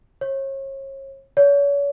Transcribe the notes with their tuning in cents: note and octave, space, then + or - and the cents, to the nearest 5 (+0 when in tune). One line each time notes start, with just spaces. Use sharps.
C#5 -35
C#5 +35